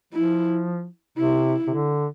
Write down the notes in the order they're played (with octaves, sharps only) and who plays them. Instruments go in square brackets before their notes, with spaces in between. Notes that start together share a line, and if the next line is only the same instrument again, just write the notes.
[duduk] F3 [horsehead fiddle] E4
[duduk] C3 [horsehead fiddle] E4
[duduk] C3
D3